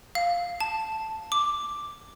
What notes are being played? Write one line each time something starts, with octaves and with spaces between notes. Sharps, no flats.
F5
A5
D6